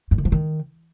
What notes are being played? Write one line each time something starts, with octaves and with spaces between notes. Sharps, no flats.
G2
D#3
F3
D#3